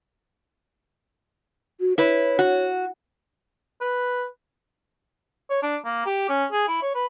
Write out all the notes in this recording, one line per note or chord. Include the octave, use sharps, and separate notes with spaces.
F#4
E4 B4 C#5
F#4
B4
C#5
D4
A#3
G4
C#4
G#4
E4
C#5
B4